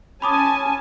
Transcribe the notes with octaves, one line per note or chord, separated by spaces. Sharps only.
C#4 G#5 A5 B5 D6 D#6